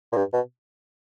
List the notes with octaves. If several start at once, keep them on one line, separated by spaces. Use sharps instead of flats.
A#2
G2
B2